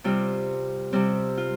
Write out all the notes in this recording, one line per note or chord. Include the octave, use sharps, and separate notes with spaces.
C3 G3 C4 F4
C3 G3 C4
F4